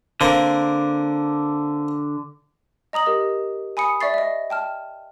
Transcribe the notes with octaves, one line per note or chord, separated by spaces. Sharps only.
D3 A#3 C4 A#4
D#5 A#5 D#6 F#7
G4 A#4 D#5
G#5 B5 D#6 C#7
D5 E5 C#6 A6 C7
D#5 E5
G5 A5 F6